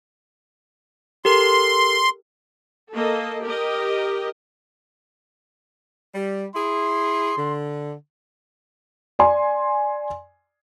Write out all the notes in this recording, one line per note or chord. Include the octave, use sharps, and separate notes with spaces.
G4 A4 A#4 C6
A#3 A4 D#5
G4 A#4 D#5
G3
E4 G#4 C6
D3
D5 G#5 C6